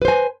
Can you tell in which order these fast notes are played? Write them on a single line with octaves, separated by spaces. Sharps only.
B4 C5 G#5